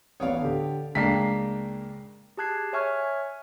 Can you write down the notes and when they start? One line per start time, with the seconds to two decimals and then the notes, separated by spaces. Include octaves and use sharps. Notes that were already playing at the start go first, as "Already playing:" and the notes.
0.20 A1 B3 C#5 D5 F5 D#6
0.40 D3 G4
0.95 C#2 G#3 A#3 D4 G5 A#5 B6 C7
2.37 G4 G#4 A5 F#6 G#6 C7
2.73 C#5 E5 G#5 C#6 F6